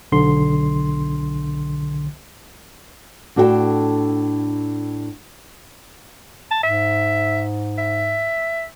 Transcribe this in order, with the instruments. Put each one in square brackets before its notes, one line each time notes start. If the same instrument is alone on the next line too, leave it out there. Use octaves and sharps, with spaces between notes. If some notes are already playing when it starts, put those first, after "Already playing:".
[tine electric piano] B1 D3 C6
[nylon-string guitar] A2 D4 F#4 A4 D5 G5
[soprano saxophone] A5
[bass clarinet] G#2 [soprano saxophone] E5
[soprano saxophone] E5